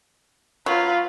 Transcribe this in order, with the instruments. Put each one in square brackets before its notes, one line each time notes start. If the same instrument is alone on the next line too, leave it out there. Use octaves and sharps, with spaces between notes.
[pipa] F#3 [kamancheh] F4 B4